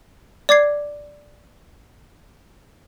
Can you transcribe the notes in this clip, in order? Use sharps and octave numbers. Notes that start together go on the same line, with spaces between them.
D5 D6 G#6 C7